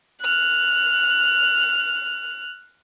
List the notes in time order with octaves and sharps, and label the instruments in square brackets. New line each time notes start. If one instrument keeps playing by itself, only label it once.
[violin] F6 F#6